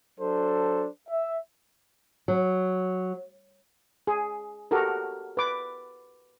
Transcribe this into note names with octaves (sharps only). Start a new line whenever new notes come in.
F#3 D4 A4 C5
E5
F#3
G#4
F#4 G4 A4 A#4
B4 D6